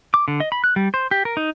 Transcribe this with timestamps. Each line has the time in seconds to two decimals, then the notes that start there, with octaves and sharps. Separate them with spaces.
0.14 D6
0.28 D3
0.40 D#5
0.52 B5
0.64 F#6
0.76 G3
0.94 C5
1.11 G4
1.25 A#4
1.37 D#4